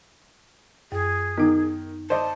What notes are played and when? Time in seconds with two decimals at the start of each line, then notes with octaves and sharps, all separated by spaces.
0.92 F#2 G#4
1.37 D#3 B3 D#4
2.10 C5 D5 D#5 A5